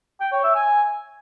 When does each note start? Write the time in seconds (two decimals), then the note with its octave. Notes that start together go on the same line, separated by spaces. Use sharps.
0.20 G5
0.32 C#5
0.44 E5
0.55 G#5